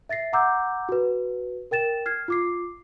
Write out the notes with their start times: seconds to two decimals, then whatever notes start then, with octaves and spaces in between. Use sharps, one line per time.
0.09 E5 A6 A#6 C7
0.33 F#5 A#5 D6 E6 G6
0.89 F#4 B4
1.71 A#4 G5 A6 E7
2.06 F6 G#6 C7
2.28 F4 D6 C7